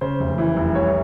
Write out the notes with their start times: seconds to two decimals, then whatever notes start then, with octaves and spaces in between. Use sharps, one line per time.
0.01 C#3 C5
0.20 F1
0.38 E3
0.56 F1
0.75 C2 C#5